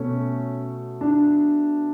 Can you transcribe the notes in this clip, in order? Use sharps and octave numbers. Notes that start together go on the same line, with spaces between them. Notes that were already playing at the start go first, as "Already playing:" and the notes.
Already playing: B2 A3 C#4
D4